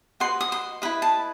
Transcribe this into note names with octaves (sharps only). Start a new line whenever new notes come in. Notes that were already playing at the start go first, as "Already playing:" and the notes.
F#4 B4 D#5 C6
D#6
C6
E4 B4 D#5 B5
A5